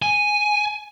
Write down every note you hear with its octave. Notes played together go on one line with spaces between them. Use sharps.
G#5